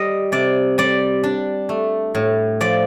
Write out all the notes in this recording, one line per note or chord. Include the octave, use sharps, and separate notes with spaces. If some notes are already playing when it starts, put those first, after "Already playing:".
Already playing: G3 D#5
C3 D5
G3 D5
D4
A3
A2
F3 D5